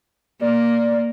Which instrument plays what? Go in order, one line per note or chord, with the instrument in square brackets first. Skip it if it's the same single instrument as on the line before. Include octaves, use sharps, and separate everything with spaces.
[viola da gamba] A#3 [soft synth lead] D5